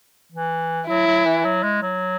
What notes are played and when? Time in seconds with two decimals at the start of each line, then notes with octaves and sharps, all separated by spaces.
0.32 E3
0.87 F#3 E4
1.07 F#3
1.26 E3
1.45 F#3
1.63 G#3
1.82 F#3